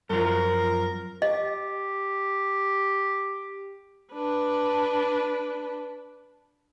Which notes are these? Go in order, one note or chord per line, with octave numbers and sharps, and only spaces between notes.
F#2 F3 A#4
G4 D#5
D4 B4